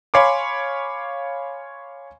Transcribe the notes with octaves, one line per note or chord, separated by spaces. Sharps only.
C#5 F5 G#5 B5 C6 D6